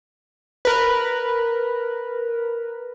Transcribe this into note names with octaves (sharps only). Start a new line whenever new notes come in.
A#4 B4